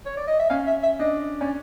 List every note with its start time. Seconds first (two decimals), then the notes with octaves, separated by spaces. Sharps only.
0.06 C#5
0.17 D5
0.28 D#5
0.39 E5
0.50 C#4 F5
0.67 E5
0.83 E5
0.99 D4 D#5
1.40 C#4 D5